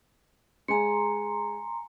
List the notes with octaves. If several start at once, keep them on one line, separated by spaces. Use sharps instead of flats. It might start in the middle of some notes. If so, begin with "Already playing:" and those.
G#3 G#5 A#5 C6 C#7